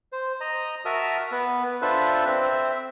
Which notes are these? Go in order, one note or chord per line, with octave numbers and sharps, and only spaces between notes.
C5
D#5 A#5
F#4 A#4 E5 A5 D#6 F6
B3 B4
D4 F4 A4 B4 C5 E5
C4 C5 E5